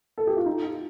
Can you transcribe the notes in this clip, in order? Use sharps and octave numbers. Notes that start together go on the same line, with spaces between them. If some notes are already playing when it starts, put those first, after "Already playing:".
A4
G4
F4
D#4